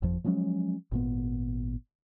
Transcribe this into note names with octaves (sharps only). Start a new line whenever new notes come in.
G1 F2 F3
F3 F#3 G#3 C#4
G#1 A#2 B3